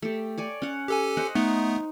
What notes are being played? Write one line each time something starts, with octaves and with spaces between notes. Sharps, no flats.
A3 G4
C#5 D5 G#5
C#4 F#5
G4 A4 G#5
C5 D#5 F#5
A3 B3 D#4